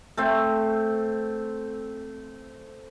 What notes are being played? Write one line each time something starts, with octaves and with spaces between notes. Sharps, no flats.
A3 C4